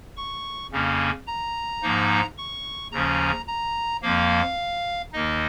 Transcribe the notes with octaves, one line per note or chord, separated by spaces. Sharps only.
C#6
F2 C#3 A#3 C#4
A#5
G#2 F3 A#3 D#4
C#6
D#2 C#3 F3 C#4 A#5
A#5
F2 F3 A#3 F5
D#2 D#3 A#3 D#4 D#5